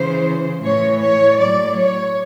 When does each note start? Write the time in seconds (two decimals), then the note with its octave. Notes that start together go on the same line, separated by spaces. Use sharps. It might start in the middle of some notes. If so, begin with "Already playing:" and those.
Already playing: C#3 E3 C5
0.62 A2 E3 C#5
1.00 C#5
1.37 A2 F#3 D5
1.75 C#5